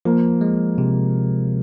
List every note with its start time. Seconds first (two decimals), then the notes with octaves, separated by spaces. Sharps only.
0.05 F3 A#3
0.41 G#3
0.78 C3